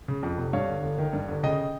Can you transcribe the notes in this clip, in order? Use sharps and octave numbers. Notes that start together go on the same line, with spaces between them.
C#3
F2
F1
G2 C#5 F5
G1
G1
D#3
G2
G1
C#3 D#5 G5